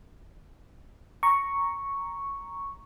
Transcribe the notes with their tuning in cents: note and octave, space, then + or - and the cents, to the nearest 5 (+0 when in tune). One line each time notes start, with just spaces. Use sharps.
A#5 +0 C#6 +0